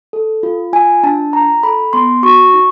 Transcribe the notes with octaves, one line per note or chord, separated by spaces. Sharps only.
A4
F4
F4 G#5
D4 A5
F4 A#5
A4 B5
B3 C6
F#4 C#6
D#4